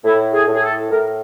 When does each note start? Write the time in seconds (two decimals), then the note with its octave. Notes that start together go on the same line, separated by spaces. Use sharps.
0.04 A2 E4
0.33 G#4
0.47 A2
0.54 G#4
0.62 A4
0.90 A2 A#4